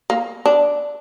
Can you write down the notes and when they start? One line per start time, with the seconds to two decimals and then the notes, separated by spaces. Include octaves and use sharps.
0.10 A#3
0.45 D4